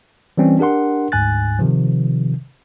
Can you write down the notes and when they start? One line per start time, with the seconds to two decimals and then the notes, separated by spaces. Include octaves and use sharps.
0.37 E3 G3 C4 C#4
0.59 D4 G4 A#4 F#5 C6
1.12 D2 G#2 G#5 F#6 A6
1.59 C3 D#3 F3